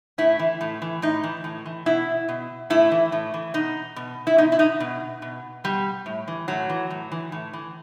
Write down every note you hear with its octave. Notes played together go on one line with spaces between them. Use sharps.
A2 E4
E3
A2
E3
A2 D#4
E3
A2
E3
B2 E4
B2
A2 E4
E3
A2
E3
B2 D#4
B2
E4
B2 D#4
E4
D#4
B2
B2
B2 G3
A2
E3
A2 F#3
E3
A2
E3
A2
E3